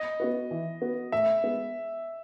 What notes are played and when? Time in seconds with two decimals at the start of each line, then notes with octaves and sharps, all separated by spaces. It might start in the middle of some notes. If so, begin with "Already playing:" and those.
Already playing: D#5
0.20 B3 F#4 B4
0.51 E3
0.82 B3 F#4 B4
1.12 A2 E5
1.44 G#3 B3